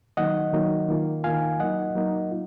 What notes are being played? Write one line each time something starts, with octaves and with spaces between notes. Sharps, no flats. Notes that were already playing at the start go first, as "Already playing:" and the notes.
D#3 F#3 A#3 D#4 D#5 F#5
D#3 F#3 A#3 D#4
D#3 A#3 F4
D#3 A#3 F4 F5 G#5
F#3 A#3 D#4 D#5 F#5
F#3 A#3 D#4
F4